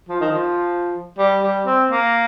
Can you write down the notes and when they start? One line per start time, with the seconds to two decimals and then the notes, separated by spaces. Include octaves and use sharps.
0.09 F3
0.21 D#3
0.32 F3
1.19 G3
1.43 G3
1.66 C4
1.91 A#3